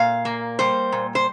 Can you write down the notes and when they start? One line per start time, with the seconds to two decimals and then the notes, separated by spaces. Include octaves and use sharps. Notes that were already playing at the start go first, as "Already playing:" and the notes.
Already playing: A#2 F5
0.25 A#3
0.59 G3 C5
0.92 A#2
1.15 C5